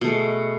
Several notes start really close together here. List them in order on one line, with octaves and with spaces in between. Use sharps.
B2 A3 G#3